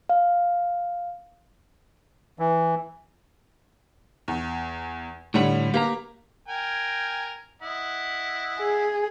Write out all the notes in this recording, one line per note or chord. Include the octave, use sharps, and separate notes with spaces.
F5
E3
E2
A2 D3 G3 C#5 B5
A#3 G4 B4 A#5
A#4 G5 G#5
E4 D#5 F#5
G#4